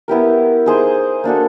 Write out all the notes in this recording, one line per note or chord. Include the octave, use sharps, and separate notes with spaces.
B3 E4 G4 A#4
D#4 G#4 C5
A#3 D4 F#4 A4